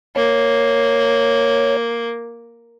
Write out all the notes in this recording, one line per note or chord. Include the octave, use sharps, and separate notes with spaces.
A#3 C#5